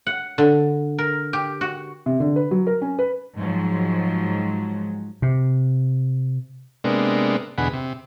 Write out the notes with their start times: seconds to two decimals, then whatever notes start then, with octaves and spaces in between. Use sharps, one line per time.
0.07 F#5
0.38 D3
0.98 A#4
1.33 G4
1.61 F#4
2.06 C3
2.20 D3
2.36 B4
2.51 F#3
2.67 A#4
2.82 C#4
2.99 B4
3.37 G#2 F3 F#3
5.22 C3
6.84 C3 G#3 A#3 B3 D4
7.58 E2 B2 D3 G#4 F#5 B5
7.73 C3